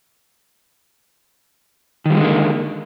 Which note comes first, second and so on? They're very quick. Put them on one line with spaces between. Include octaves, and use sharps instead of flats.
D#3 G3 G#3 D3 A#3